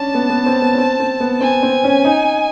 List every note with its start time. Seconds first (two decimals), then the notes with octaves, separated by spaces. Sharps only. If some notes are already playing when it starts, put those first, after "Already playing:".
Already playing: C#4 D4 A5
0.14 B3
0.30 B3
0.46 C4
0.62 B3
0.74 C#4
0.78 C4
1.00 C4
1.20 B3
1.41 C4 G#5
1.63 C4
1.84 C#4
2.05 D#4